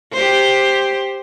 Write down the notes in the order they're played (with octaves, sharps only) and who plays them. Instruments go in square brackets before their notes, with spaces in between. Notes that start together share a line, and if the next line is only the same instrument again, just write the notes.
[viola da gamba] G4 C5